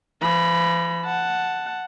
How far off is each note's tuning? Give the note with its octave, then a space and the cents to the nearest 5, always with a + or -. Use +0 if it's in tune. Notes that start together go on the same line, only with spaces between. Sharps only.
F3 -45 B5 +0
F#5 +0 A5 +0